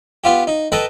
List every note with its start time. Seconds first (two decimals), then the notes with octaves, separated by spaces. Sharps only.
0.24 B3 F4 G4
0.47 D#4
0.72 A4 B4 D#5 G5 A#5